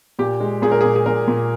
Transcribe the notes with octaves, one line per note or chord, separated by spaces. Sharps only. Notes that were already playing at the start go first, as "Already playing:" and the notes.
A#2 G4
G#3
A#2 G#4
A#4
A#2 G#4
G#4
A#2 A#4
A#2